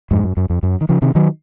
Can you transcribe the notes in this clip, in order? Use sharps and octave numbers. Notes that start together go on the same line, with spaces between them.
F2 G#2
F#2
F#2
F2
F#2
D#3
C#3 F3
C3 D#3
D#3 F#3